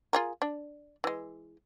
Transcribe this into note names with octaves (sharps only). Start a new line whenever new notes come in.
F4 G#4 A#4
D4
E3 G#3